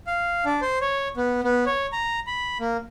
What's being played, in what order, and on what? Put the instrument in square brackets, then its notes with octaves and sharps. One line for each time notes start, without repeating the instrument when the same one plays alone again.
[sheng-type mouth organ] F5
D4
C5
C#5
B3
B3
C#5
A#5
B5
A#3